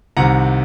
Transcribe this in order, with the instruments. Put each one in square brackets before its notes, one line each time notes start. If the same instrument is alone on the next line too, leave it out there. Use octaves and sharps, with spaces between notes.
[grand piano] C2 C3 D#3 F#5 A#5